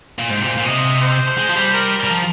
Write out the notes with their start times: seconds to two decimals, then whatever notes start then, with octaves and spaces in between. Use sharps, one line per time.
0.19 A#2
0.29 G#2 C5
0.41 C3
0.47 A#2
0.57 A#2
0.65 C3 D#5
1.01 C5
1.37 G#3
1.49 F3
1.55 G3
1.73 A#4
2.04 G3
2.09 F3